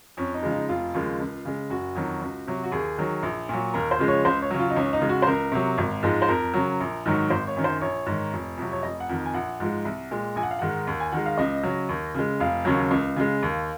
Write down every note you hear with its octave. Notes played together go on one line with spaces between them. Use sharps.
F2 C#4
D#4
C#3 F3 G#3
D#4
F1 F4
D#2 C#3 F3 G#3
C#2
C#3 G#3
F#1 F#4
F2 D#3 F#3
C#2
C3 F#3
F#4
D#2 G#4
D#3 F#3
A#1
A#2 F#3
D#2 A#4
C5
C#3 F3 G#3
C#5
C#2 C5
C#5
C#3 F#3
F4
D#4
C#2 C#4
D#4
C#3 G#3
F#4
C5
C#2 A#4
C3 F#3
G#1
G#2 F3 G#3
C5
F2 A#4
C#3 F#3
A#1
G#2 D#3 F#3
G#1 C5
C#5
F#2 D#3
C5
A#1 C#5
G#2 D#3
F1
F2 C3 F#3
C#5
F1 D#5
F#5
F2 D#3
G#5
A#1 F#5
G#2 F3 G#3
C2
A#2 G#3
A#1 G#5
F#5
F5
G#2 D#3 G#3 F#5
D#2
G#5
D#3 G#3 F#5
F5
C#2 D#5
C#3 F#3
D#2
C#3 G#3
F1 F5
D#2 C#3 F#3
C#2
C#3 G#3
D#2